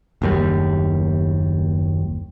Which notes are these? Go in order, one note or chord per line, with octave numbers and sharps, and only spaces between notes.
F#1 D#2 G3